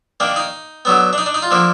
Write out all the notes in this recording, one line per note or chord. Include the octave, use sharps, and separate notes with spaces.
D#3 A#3 D4
D#4
D3 F#3 B3
D4
D#4
D4
D#4
F4
D3 F3 A#3